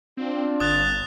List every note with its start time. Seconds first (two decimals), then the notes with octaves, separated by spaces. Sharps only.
0.17 C4 D4 F4
0.60 G1 D#6 F#6 A6 F7